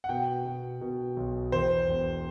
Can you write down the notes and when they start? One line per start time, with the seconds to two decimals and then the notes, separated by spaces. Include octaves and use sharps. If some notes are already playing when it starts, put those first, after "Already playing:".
0.04 F#5
0.09 B2 G5
0.45 B2
0.81 B2
1.16 B1
1.52 E2 C5
1.88 E1